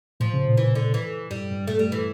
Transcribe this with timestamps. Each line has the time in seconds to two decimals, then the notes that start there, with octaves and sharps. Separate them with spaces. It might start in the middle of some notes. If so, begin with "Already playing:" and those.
0.20 A2 F3
0.34 C#3
0.45 A#2
0.57 E3
0.75 D3
0.94 E3
1.30 G2 G3
1.51 G2
1.67 A3
1.79 G3
1.92 E3